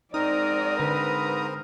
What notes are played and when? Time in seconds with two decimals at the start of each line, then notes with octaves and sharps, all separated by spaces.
0.14 G#2 C4 D#4 A#4 D5 A#5 D#6
0.80 D3 B4